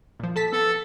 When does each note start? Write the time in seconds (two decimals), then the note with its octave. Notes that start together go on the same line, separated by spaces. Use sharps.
0.20 A#2 F3
0.36 A4 A5 B6
0.53 B3 A4